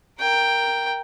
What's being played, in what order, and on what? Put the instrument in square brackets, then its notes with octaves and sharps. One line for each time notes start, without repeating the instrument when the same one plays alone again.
[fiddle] A#4 G5